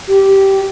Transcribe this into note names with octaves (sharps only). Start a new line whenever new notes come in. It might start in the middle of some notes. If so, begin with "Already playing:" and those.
G4